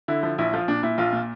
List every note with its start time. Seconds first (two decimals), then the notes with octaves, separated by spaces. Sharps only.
0.08 D3 E4
0.23 F3
0.38 A#1 E4
0.53 F3 F4
0.68 A#2 D4
0.83 A#2 E4
0.98 A#1 F4
1.13 A#2